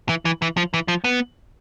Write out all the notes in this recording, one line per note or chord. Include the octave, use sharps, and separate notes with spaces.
E3
E3
E3
F3
E3
F3
B3